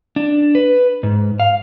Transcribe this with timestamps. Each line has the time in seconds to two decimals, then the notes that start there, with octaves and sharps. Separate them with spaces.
0.16 D4
0.55 B4
1.03 G#2
1.40 F5